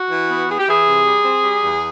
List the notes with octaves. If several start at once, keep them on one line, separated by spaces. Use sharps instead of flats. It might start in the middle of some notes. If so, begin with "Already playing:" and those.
Already playing: F#4
E3
B3
E3 G#4
G4
E3 G#4
C3
G3
C4
G3
E2